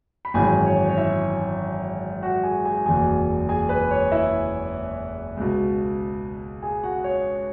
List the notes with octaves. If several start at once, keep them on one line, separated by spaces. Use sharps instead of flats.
B5
G#1 F#2 E3 G#4 G#5
C#5
C#5
E4 E5
F#4 F#5
G#4 G#5
G#4 G#5
F#1 E2 B2 G#4 G#5
G#4 G#5
B4
C#5
E4 E5
C#2 B2
G#4 G#5
F#4 F#5
C#5